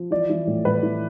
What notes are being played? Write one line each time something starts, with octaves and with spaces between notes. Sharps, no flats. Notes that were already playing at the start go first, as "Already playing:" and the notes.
Already playing: F3
E3 D5
E3
A2
A2 B4
E3